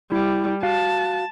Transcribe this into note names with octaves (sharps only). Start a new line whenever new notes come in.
G3 E4
F#4 F5 A5